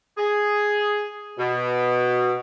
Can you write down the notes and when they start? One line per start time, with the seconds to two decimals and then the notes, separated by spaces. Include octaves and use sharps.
0.17 G#4
1.38 B2